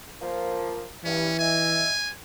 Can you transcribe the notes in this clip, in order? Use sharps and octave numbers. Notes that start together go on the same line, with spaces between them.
F3 A#3
G2 E3 C#4
D#5 E5 G#5